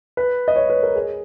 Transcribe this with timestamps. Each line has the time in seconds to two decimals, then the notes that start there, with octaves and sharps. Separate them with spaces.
0.17 B4
0.48 D#5
0.56 C#5
0.70 B4
0.83 A#4
0.96 G#4